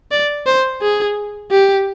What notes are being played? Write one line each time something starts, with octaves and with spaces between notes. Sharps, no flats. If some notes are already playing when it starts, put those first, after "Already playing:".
D5
C5
G#4
G4